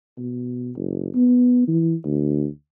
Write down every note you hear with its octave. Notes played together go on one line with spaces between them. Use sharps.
B2
F#1
B3
E3
D2